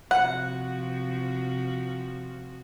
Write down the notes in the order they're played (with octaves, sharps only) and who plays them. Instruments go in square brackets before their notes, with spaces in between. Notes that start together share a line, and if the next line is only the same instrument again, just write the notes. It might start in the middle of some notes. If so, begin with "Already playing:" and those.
[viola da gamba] C3 F3 F#4 [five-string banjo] F#5